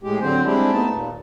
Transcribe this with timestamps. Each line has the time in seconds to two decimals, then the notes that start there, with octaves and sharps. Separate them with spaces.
0.03 A2 G#3 G4
0.21 D3 F#3 C4 C5
0.44 G3 G#3 C4 D4 E4 G4
0.72 A3 B3 D#4 A5
0.90 D#2 A#2